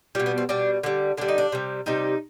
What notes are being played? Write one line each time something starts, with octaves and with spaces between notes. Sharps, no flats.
B2 G3 F4
B3
C4
B2 G3 D4
D3 G3
D3 G3 D4
D#4
D4
C3 G3
C3 G3 D#4